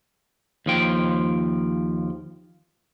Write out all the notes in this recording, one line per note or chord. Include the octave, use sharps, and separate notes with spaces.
D#2 F3 G5